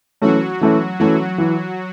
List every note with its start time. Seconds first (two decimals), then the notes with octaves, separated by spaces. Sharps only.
0.21 E3 F#3 A3 C#4 F#4
0.61 E3 A3 C#4
0.99 E3 F#3 A3 C#4 F#4
1.38 E3